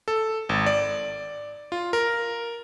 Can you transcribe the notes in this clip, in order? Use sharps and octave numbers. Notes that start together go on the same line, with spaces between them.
A4
G#1
D5
F4
A#4